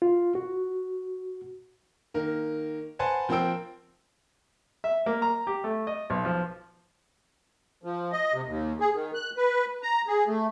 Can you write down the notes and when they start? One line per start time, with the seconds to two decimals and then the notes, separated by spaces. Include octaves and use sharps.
0.02 F4
0.35 F#4
2.14 D#3 A#3 A#4
2.99 B4 C5 F#5 G#5 A5 C6
3.29 F3 C4 A#4 G5 E6 D7
4.84 E5
5.06 A#3
5.22 A#5
5.47 G4
5.64 A3
5.87 D#5
6.10 B1
6.25 F3
7.83 F3
8.12 D#5
8.33 C3
8.47 D#2
8.80 G#4
8.94 D#3
9.15 F#6
9.37 B4
9.82 A#5
10.07 G#4
10.27 A3